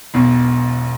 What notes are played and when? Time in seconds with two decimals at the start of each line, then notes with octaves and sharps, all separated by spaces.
0.14 E1 B1 B2